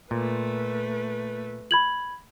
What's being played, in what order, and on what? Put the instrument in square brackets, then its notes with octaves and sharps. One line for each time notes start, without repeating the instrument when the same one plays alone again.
[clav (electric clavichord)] A#2 [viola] A3 B4
[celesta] B5 G#6 F#7